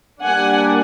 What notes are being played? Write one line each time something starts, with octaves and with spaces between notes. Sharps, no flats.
G3 A#3 D4 F#5 G#5